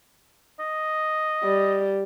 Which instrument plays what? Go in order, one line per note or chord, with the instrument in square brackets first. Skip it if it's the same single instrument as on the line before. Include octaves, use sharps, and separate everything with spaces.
[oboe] D#5
[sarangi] G3